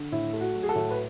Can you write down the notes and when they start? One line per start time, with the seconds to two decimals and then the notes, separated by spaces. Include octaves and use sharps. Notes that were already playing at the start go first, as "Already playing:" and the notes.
Already playing: D3
0.12 A2 E4
0.33 A3
0.40 F#4
0.54 F#3
0.63 G#4
0.69 F#4 A4
0.76 A2
0.91 B4